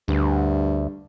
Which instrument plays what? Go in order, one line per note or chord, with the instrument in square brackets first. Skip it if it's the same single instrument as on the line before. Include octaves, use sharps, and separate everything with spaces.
[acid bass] D2 [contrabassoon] G2